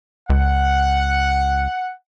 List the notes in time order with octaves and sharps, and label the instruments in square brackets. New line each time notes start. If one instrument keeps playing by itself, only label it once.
[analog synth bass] C#2 [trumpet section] F#5